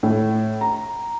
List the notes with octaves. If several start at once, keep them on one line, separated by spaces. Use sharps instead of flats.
A2
A#5